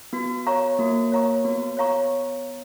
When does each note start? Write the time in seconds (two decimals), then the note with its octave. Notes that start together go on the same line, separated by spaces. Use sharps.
0.13 B3 F#4
0.47 C#5 F5 A#5 C#6
0.79 A#3 F#4
1.12 C#5 F5 A#5 C#6
1.45 B3 F#4
1.77 C#5 F5 A#5 C#6